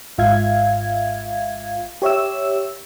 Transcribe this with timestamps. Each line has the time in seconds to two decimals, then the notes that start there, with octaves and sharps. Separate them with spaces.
0.18 G#1 G#2 F4 E5 F5 G#6
2.02 G4 C#5 E5 E6